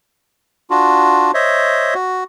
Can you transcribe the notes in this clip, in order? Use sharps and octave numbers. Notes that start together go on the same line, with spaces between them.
D4 F4 F#4
C5 C#5 D#5 E5
F#4